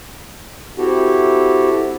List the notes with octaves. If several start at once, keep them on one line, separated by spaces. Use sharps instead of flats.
C4 E4 F#4 G4 A4